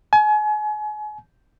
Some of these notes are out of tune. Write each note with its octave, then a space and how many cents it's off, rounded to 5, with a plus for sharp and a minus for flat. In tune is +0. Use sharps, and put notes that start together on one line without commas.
G#5 +35